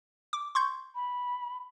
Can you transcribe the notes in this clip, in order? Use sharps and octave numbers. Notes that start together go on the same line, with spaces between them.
D6
C6 C#6 G6
B5